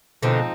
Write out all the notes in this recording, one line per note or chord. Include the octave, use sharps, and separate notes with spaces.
G#2 B2 D3 F3 C4 D#4